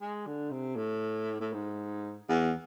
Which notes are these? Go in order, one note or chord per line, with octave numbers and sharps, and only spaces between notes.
G#3
D3
C3
A2
A2
G#2
E2